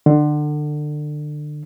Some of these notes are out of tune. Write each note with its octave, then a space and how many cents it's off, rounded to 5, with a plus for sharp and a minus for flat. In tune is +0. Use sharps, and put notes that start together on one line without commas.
D3 +30